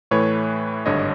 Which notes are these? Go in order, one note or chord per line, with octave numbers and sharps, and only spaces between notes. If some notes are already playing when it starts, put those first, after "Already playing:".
A2 E3 A3 B4 C#5
G#1 G2 D3 C#5 D#5